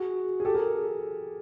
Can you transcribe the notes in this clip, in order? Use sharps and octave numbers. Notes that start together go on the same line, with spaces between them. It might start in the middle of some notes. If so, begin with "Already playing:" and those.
Already playing: F#4 G#4
G#4
G4 A4
G#4 A#4